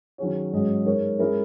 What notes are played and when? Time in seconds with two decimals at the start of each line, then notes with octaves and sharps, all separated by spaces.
0.18 D#3 F#3 C#4 G#4 C#5
0.52 G#2 F#3 C#4 G#4 D#5
0.86 G#3 D#4 A#4 C#5
1.19 G#3 C#4 E4 A#4